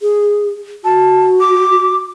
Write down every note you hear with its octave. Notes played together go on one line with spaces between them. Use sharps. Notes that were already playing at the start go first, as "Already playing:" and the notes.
G#4
F#4 A5
D6